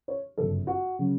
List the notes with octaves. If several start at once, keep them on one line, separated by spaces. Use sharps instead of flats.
C#5
G1 F#2 C#3 F#3 A4
F#4
C#3 F#3